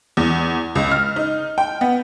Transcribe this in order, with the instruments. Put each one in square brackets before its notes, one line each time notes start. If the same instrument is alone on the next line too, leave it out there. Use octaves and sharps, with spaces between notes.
[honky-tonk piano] E2
C#2
F6
D#4
G5
B3